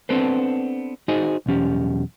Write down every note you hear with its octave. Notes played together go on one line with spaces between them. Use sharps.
B3 C4 D4 A4 B4 C5
D#4 F#4 G#4 C5 D#5
B1 E2 C#4 G4